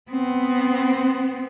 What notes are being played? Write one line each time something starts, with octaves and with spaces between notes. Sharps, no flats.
B3 C4